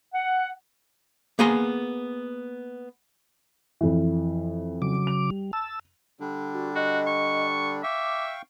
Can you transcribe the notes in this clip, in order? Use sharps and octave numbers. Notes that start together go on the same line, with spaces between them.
F#5
A#3 B3 G#4 G#5 A#5 C6
F2 E3
C#3 F#3 D6
F7
G3
A5 E6
D3 G3 D4
F#4
F#4 D#5
C#6
E5 F5 G5 C#6 D6